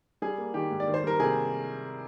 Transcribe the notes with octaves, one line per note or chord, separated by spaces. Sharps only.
G3 G#4
A#3
D#3 G4
G#2
D5
D#3
C5
G3 A#4
C3 G#4